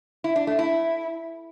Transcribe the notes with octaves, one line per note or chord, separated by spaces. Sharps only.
E4
D4
A3
E4